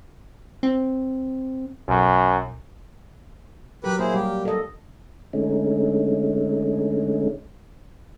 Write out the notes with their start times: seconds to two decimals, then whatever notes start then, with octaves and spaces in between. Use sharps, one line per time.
0.63 C4
1.89 B1 F#2
3.84 F#3 G4 A#4 B4 B5
3.99 A#3 E4 G#4 C5
4.14 G3 G4
4.45 A4 D#5
5.33 D3 G#3 A3 C#4 D#4